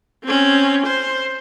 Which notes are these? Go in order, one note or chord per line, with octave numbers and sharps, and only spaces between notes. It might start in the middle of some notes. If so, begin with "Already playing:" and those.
C4 C#4
C5